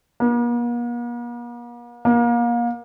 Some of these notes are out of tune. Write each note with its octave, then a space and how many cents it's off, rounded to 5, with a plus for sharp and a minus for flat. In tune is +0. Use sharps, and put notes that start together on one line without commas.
A#3 +45
A#3 +30